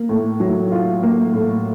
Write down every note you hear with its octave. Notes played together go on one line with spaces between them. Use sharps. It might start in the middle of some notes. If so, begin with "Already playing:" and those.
Already playing: A#3
A2
F#3
F4
A#3
A2